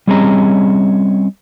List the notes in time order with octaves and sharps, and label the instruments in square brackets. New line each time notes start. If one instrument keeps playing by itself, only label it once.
[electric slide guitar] G3 C4 C#4 G#4 D#5 A#5